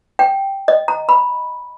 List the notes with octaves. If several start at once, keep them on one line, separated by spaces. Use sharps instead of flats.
G5
D#5
A#5
B5